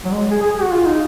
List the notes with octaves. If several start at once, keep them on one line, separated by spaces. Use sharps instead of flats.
F#3
G#3
G#4
G#4
G#4
F#4
F4
D#4